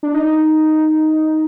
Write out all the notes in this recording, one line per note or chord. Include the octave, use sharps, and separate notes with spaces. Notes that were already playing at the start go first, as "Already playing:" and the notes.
D4
D#4